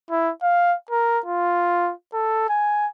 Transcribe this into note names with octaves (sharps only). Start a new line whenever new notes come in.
E4
F5
A#4
F4
A4
G#5